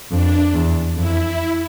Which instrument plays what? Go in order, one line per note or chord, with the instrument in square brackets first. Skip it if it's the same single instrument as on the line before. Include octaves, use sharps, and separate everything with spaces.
[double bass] F2 [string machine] D4
[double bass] E2
[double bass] F2 [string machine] E4
[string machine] E4